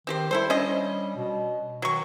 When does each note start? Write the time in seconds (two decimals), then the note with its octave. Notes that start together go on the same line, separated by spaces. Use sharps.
0.07 D#3 C4 G4 C5
0.31 G3 E4 A4 C5
0.50 C#4 D4 D#5
1.16 B2
1.82 D#3 F#3 C#6